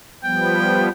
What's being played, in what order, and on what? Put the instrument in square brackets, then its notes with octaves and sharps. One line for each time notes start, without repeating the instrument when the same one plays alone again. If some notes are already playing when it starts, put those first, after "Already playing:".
[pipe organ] F3 G3 B3 [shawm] G5